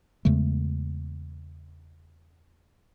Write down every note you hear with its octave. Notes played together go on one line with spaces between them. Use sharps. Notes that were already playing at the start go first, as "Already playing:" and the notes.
E2 C#3 G#3 A3